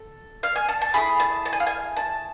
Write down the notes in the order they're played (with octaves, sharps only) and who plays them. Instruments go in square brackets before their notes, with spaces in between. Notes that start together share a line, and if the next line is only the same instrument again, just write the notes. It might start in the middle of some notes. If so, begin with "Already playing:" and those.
Already playing: [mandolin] A4
F5
G#5
A5
A5
A3 E4 G#4 B5
A5
A5
G#5
F5
G#5
A5